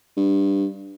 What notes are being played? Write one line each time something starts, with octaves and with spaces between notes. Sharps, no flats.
G2